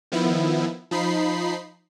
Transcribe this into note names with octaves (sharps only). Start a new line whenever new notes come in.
D#3 F3 B3 E4
F3 D#4 B5 C7